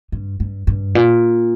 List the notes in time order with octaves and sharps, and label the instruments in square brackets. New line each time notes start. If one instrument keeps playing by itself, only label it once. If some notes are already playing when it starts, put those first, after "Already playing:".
[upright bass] G2
G2
G2
A#2